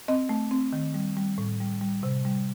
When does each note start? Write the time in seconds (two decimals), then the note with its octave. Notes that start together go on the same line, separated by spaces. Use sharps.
0.08 C4 D#5
0.29 A3
0.51 C4
0.73 D#3
0.94 G3
1.17 G3
1.38 A2
1.60 G3
1.81 G3
2.03 C3
2.25 G3